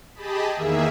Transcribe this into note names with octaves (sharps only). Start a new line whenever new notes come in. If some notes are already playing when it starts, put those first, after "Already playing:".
G4 G#4 D#5 A5 B5
E2 D#3 A#3 G#4 E5